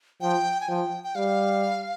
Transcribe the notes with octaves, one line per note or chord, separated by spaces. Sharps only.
F3 G5
G#5
F3 G5
G5
G3 F5